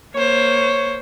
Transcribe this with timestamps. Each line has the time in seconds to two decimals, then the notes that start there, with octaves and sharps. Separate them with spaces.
0.14 A#3 C5 C#5